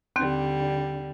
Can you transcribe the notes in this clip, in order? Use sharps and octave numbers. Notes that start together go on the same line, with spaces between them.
D#2 D3 G3 C4 G6